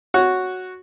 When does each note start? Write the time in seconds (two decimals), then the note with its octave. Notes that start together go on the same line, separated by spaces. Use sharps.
0.14 F#4 C#5 F#5